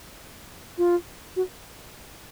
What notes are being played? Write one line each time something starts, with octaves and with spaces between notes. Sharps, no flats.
F4
F#4